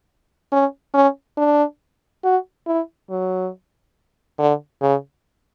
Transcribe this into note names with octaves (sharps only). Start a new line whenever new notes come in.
C#4
C#4
D4
F#4
E4
F#3
D3
C#3